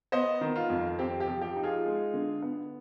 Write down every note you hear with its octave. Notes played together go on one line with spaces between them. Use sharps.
B3 C5 D#5
D#3
F4
F2
C4 G4
G4
F3
G4
D#4
F4 G#4
G#3
D3
B3